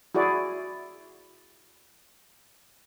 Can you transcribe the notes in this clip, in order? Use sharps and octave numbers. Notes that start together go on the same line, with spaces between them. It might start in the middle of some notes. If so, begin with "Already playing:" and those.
E4 F#4 G#4 D5